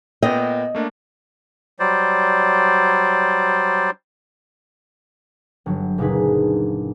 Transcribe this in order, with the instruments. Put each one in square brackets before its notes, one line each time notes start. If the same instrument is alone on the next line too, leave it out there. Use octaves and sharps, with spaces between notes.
[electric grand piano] A#2 B3 G5 [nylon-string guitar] D#5
[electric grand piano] A3 A#3 D4
[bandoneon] F#3 G3 C5 D5
[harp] G1 F#3
F#1 A#2 D4 D#4 G#4 B4